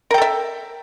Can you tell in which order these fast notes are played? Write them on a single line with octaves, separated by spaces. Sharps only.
A#4 G5 A4 E5